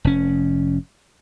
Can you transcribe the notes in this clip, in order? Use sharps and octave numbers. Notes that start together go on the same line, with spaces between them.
F1 C#4